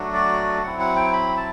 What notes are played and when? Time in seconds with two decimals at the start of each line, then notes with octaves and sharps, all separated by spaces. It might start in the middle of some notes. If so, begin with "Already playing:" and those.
Already playing: F#3 A3 D4 F#4
0.13 D5
0.63 F#3 C4 E4 F#5
0.80 F#5
0.96 G5
1.13 B5
1.37 A5